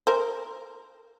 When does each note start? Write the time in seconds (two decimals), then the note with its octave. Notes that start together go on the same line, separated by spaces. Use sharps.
0.07 A#4 C5